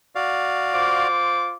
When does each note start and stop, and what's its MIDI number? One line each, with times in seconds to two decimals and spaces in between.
0.15 1.07 66
0.15 1.07 74
0.15 1.07 77
0.73 1.57 65
0.73 1.57 72
0.73 1.57 86